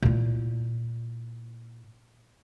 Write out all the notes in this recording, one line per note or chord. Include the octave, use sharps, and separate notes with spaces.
A#2 E4